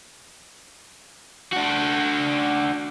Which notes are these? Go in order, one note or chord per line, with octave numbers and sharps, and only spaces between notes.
D4 F#4